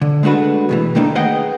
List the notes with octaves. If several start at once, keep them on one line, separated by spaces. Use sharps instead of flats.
D3
G#3 A3 D4 F#4 B4
E2 B2 E3
D#3 E3 A3 A#3 D4 D#4
G#4 B4 D#5 F#5 G5